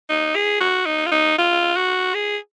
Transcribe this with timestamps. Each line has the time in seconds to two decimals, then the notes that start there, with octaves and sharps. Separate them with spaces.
0.09 D#4
0.35 G#4
0.60 F#4
0.86 D#4
1.06 F4
1.11 D#4
1.38 F4
1.76 F#4
2.14 G#4